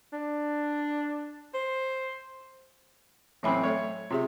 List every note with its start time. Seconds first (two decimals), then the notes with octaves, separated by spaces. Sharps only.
0.13 D4
1.54 C5
3.43 A2 E3 F#3 C4 E5 B5
3.63 A3 A4 C#5 E5
4.11 C3 F4 G#4 E5